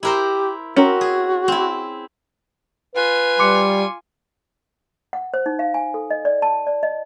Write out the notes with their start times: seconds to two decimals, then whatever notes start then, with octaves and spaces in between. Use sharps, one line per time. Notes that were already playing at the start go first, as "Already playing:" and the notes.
0.03 E4 G4 A#4 C5
0.76 C4 C#4 F#4 A#4
1.01 G#4
1.48 C4 E4
2.95 F4 B4 G#5
3.39 G3 C6 D6 C#7
5.13 F#5
5.34 C5
5.46 D#4
5.59 F5
5.74 G#5
5.94 A4
6.11 D#5
6.25 D5
6.42 A5
6.67 D5
6.83 D#5